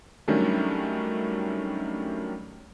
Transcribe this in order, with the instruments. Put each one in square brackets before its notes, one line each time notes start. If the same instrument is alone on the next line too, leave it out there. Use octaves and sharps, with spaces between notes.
[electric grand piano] D#3 F#3 G3 A3 C#4 D4